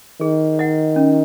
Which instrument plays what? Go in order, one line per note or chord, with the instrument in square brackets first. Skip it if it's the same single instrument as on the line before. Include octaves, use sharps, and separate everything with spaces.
[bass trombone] D#3 [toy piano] G#4
[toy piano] D#5 F#5
C#4